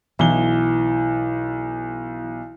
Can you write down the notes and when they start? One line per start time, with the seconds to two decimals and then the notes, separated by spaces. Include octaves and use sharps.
0.19 B1 E3 G7